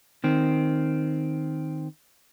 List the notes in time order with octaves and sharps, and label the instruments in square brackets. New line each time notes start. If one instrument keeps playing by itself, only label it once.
[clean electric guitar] D#3 C4